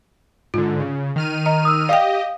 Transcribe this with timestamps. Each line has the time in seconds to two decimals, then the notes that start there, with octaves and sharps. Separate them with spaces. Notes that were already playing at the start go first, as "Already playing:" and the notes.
0.54 G#2 D3 F4
0.80 C#3
1.16 D#3 F6 D#7
1.46 D#5 A#5
1.65 D#6 E6
1.89 G4 D5 D#5 F5 G5 D#6